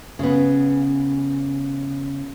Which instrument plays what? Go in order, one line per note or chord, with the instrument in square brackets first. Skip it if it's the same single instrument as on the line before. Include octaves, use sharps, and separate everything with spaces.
[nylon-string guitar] C#3 B3